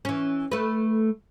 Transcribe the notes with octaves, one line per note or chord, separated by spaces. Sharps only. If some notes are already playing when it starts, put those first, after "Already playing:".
E3 C#4
A3 B4